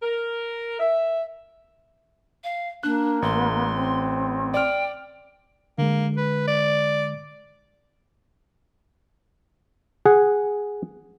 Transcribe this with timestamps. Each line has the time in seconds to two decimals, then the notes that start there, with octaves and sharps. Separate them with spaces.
0.02 A#4
0.79 E5
2.44 F5
2.83 A#3 D4 F#6
3.22 A1 C6
3.74 C4
4.54 D5 G5 F6
5.78 D3 G#3 A#3
6.17 B4
6.48 D5
10.06 G#4 F#5